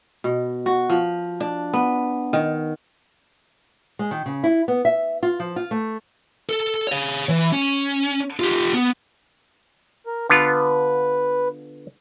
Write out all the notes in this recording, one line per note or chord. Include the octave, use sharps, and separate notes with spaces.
B2
F#4
F3
D4
B3
D#3
G#3
D#3
C#3
E4
B3
E5
F4
F3
F4
A3
A4
C#5 F5
E3
C#4
F4 G4
B3
A#4
D3 B3 F4 B4